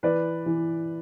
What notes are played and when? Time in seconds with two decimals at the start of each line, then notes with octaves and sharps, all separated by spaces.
0.03 E3 B4 D5
0.46 E3